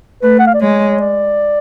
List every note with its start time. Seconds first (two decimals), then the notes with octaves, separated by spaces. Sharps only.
0.23 A3 B4
0.39 F#5
0.47 F5
0.54 D5
0.61 G#3 C#5
1.00 D5